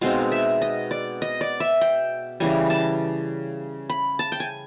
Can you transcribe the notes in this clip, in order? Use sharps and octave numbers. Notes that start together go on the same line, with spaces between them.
B2 G#3 C4 D#4 F5
E5
D#5
D5
D#5
D5
E5
G5
C#3 E3 G3 G#5
A5
B5
A5
G5
G#5